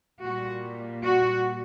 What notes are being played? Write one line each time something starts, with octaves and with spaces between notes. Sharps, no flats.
A#2 G3 F#4
F#4